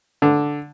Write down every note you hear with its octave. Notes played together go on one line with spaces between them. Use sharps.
D3